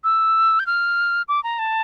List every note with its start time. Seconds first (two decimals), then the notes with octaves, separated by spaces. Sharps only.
0.04 E6
0.59 G6
0.66 F6
1.28 D6
1.44 A#5
1.59 A5